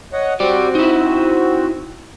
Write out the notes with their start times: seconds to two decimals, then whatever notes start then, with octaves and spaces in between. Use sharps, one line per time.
0.13 C#5 D#5 F#5
0.40 C4 F#4 G4 D5
0.75 D#4 E4